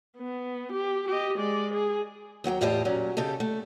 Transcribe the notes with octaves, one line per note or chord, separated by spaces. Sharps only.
B3
G4
G4 D#5
G#3 D5
G#4
D#2 F#3 F#5 G5
E2 A2 F4 G4 D#5 A5
A#2 F#3 C#4
C#3 D#4 G4 A4
A3